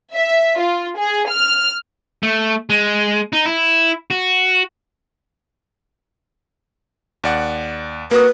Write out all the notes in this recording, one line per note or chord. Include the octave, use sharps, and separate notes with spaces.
E5
F4
G#4
F6
A3
G#3
D#4
E4
F#4
D#2 D5 F#5
A#3 F#4 B4 D#6